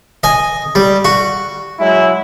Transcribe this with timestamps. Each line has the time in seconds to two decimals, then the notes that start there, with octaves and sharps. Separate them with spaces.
0.23 D#5 G#5
0.75 G3
1.05 F#4
1.80 F#3 G#3 E4